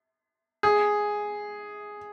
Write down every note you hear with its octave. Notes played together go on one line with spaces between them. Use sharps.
G#4